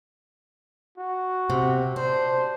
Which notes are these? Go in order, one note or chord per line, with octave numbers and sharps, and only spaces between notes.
F#4
C3
D4 C5